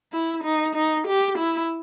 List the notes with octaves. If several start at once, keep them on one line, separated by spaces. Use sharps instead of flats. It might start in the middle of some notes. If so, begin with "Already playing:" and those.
E4
D#4
D#4
G4
E4